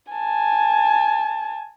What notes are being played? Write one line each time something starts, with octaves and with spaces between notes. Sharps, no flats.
G#5 A5